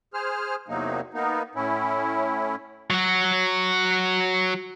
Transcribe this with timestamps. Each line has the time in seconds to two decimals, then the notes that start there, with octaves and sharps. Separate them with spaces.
0.14 G#4 C5 F6
0.68 E2 C3 F#3 A#3 D#4
1.14 A#3 B3 D#4
1.55 A2 C#4 E4
2.90 F#3 F#4